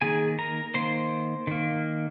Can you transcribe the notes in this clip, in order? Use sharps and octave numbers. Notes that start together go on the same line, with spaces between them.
D#3 A#3 G#4 G#5
A#4 A#5
D#3 A#3 C5 C6
D#3 A#3